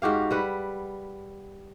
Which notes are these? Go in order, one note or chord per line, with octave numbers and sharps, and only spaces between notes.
G#2 F#4 G4 F5
G3 B4 F#5